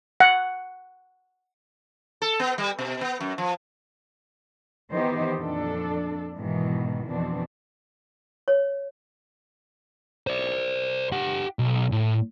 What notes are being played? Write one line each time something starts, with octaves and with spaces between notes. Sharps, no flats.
F#5
A4
B3
G3
B2
B3
F#2
F3
D#3 E3 B3 D#4 G4 C5
F2 A#2 D4 A4
G#2 B2 D#3 E3
F2 B2 E3 C4 D4
C#5
C5 D5
G4 F#5
B1
A2